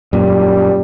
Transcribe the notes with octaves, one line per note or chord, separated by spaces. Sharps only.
F#2 A#2 G3